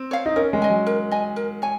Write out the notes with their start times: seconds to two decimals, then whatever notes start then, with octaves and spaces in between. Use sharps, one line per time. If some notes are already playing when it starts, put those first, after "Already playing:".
Already playing: C4
0.11 C#5 F5
0.26 D#4
0.36 C#4 A#4
0.53 G#3
0.62 D#5 G#5
0.70 F#3
0.86 A#4
1.11 D#5 G#5
1.36 A#4
1.62 C#5 G#5